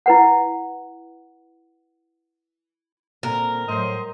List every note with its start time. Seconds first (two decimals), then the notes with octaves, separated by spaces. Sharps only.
0.06 E4 B4 F#5
3.23 A#2 D3 C4 A#4
3.68 A2 F#3 C5 D#5 C6